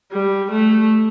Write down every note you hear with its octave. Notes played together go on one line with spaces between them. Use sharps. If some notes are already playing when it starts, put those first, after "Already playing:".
G3
A3